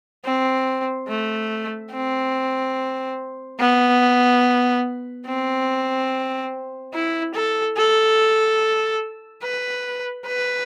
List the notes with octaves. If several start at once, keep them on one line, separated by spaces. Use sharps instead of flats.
C4
A3
C4
B3
C4
E4
A4
A4
B4
B4